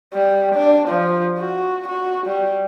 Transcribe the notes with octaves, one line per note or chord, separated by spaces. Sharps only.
G3
D4
F3
F#4
F#4
G3